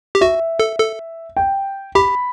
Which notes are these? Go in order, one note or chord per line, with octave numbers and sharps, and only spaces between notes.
G4
F#4 E5
A4
A4
G5
G4 B5